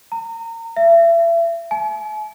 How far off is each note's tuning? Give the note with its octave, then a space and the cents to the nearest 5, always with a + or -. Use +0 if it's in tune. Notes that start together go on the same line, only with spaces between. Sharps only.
A#5 -30
E5 +35
G#5 +45